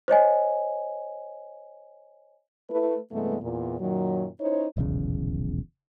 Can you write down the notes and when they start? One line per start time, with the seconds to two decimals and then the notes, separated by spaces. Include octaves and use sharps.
0.08 C5 C#5 D#5 G#5
2.70 A3 E4 B4
3.10 G2 C3 E3 G#3 A3 B3
3.40 E2 A#2
3.79 F#2 A#2 D#3 F#3
4.39 C#4 D#4 E4 C5 C#5
4.77 D#1 B1 E2 C#3